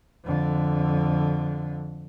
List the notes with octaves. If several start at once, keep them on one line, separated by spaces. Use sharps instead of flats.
F2 D3